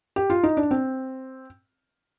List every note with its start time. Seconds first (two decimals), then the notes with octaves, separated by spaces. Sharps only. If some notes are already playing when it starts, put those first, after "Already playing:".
0.16 G4
0.30 F4
0.43 D#4
0.57 D4
0.71 C4